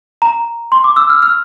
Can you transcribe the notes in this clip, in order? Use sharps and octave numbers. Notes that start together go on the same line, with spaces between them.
A#5
C6
D6
E6
F6
F6